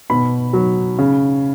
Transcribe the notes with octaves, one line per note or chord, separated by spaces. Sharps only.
B2 B5
F#3
C#3